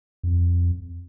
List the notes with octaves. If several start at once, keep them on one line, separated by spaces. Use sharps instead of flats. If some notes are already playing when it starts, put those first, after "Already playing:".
F2